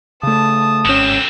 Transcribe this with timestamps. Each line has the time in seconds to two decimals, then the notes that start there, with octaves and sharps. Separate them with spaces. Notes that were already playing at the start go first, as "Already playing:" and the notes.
0.23 C#3 A3 A5 D#6
0.86 G#1 D3 C4 C#4 E7